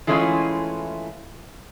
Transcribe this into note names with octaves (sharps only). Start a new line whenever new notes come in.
E3 G#3 A3 C#4 E4 F4